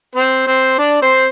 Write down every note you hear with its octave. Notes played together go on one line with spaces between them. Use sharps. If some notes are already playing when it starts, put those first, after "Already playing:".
C4 C5
C4 C5
D4 D5
C4 C5